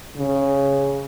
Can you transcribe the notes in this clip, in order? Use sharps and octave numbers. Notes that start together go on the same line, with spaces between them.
C#3